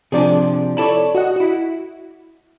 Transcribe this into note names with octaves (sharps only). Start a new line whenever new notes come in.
C3 F3 D4 G#4 D5
E4 A4 C#5 D5 A5 B5
F#4 D#5 F#5
E4 F#4